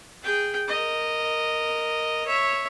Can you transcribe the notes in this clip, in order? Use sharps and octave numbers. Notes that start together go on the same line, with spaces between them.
G#4 G5
A#4 D#5
C#5 E5